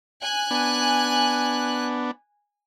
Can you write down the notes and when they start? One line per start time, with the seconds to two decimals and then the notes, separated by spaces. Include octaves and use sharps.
0.21 G#5 F#6
0.51 B3 D4